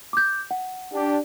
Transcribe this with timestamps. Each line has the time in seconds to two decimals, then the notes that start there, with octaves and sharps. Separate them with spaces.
0.13 D6 G6
0.51 F#5
0.93 D4 G4